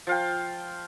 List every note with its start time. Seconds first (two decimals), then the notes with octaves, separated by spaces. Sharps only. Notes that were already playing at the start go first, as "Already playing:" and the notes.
0.07 F3 F5 G5